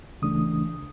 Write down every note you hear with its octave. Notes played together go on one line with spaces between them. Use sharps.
D2 C#3 E3 A3 D4 D#6